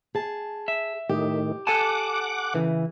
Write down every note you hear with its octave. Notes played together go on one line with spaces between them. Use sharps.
G#4 A5
E5
A2 D#3 G4
A4 F#5 G#5 A5 D6
C#3 E3